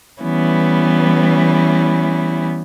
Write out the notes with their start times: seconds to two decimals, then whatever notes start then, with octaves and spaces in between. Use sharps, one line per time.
0.21 E3 G3 B3 C#4 E4